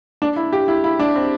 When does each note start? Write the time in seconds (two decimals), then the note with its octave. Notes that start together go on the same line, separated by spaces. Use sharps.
0.22 D4
0.36 E4
0.53 G4
0.68 E4
0.84 E4
0.99 D4
1.16 C4